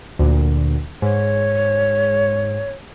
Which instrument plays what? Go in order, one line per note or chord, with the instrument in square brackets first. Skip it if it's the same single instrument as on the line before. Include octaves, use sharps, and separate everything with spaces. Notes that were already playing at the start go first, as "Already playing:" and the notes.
[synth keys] D2 A#2
[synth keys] G#2 [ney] C#5